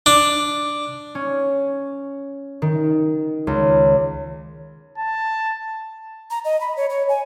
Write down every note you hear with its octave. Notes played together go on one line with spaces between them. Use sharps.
D4
C#4
D#3
C#2
A5
A#5
D#5
B5
C#5
C#5
G#5